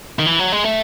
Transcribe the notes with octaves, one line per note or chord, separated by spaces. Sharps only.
D#3
E3
F#3
G#3
A3